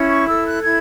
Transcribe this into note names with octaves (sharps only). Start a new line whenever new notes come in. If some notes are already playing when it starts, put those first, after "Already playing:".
Already playing: C#4 E4
C#6
A4 E6
F#6
E4 G#6